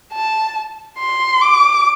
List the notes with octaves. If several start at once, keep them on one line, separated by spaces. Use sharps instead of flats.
A5
C6
D6